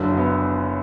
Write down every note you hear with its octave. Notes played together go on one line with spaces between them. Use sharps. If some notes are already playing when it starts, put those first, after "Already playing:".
Already playing: F#1 F#2 D3
B3